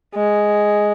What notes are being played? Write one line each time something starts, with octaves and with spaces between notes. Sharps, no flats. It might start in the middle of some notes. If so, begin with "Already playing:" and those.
G#3